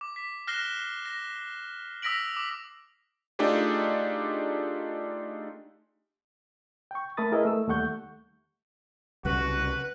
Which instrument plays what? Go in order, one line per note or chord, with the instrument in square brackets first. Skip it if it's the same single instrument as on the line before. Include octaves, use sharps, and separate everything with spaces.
[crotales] D6
B6
F6 F#6 A#6 C7 E7 G7
A#6
D#6 E6 A#6 B6 D7 F#7
D6
[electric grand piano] A3 D4 D#4 F4 G4 G#4
[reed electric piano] G5 C#6
A3 A4 A#4 B5 D#6 A6
E4 G#4 A#4 B4 D#5 E5
A3 E6
D#2 G3 A3 F#5 C#6 G6
[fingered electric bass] C2 C#3 G3 [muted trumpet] F#4 [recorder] B4